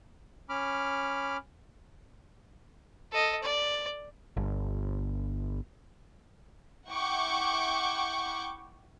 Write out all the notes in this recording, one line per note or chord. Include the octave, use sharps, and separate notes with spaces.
C#4 B5 D6 F6
A4 D#5
D5
G1
E4 F#5 G5 C#6 D6